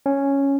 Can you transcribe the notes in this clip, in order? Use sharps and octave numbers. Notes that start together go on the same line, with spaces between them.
C#4